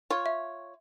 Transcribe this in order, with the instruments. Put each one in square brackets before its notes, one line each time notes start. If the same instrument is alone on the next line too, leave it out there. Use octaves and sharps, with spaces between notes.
[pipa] F4 C#5
[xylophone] E5